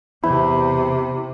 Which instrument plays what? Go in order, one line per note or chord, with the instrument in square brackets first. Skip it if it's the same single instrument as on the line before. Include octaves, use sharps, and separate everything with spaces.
[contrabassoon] E2 [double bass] C3 [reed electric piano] E4 [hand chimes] B5